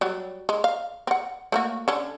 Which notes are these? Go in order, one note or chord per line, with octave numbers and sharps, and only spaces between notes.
F#3 G3
G#3
F5
C4 F#5
A3 A#3 F#4
D3 C#4